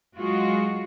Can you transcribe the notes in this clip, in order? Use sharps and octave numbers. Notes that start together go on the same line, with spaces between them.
F#3 G#3 F4 F#4